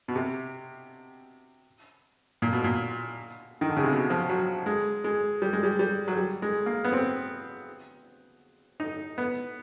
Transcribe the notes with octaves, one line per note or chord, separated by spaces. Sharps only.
B2
C3
A#2
B2
A#2
D#3
D3
C#3
C3
B2
F3
F#3
G#3
G#3
G3
G#3
G3
G3
F#3
G3
G#3
A#3
B3
C4
D#4
B3